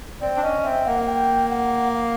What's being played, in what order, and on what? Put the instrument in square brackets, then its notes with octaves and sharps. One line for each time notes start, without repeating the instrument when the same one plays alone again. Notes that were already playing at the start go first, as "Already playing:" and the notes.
[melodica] C4 [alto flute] D5
[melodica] D4
[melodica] C#4 [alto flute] D#5
[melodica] C4 [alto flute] E5
[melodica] A#3 [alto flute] F#5
[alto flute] F#5
G5
F#5
F5